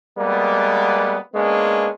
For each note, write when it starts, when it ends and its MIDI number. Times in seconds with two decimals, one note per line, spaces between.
0.18 1.17 55
0.18 1.17 56
0.18 1.17 58
0.18 1.17 59
1.33 1.89 56
1.33 1.89 58
1.33 1.89 59
1.33 1.89 61
1.33 1.89 62